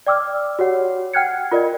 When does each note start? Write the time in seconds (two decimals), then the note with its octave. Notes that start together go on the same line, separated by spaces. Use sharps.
0.07 D5 G5 D6 E6 F6
0.59 F#4 G4 C#5 F#5
1.13 F#5 G5 F6 F#6 G#6 C#7
1.52 F4 A#4 D5 D#5